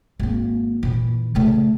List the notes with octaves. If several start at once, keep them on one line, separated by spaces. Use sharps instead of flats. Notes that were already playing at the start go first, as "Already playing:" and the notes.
G#1 A#3
A#2 E3
C#3 A3